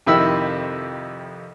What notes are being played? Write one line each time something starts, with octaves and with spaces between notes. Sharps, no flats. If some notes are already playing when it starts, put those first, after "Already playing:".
F2 C3 D#3 E4 B5 E6